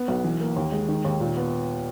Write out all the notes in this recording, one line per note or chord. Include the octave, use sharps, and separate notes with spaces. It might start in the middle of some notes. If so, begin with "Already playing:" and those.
Already playing: B3
B1
E3
A#3
D#2
G#3
D#3
D#2
A#2
B3